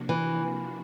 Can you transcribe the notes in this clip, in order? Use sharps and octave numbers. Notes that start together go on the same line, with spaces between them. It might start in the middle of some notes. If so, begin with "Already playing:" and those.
Already playing: C3 F3 A#3 D4 F#4
E3